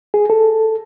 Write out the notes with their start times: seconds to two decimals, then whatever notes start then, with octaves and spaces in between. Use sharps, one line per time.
0.14 G#4
0.30 A4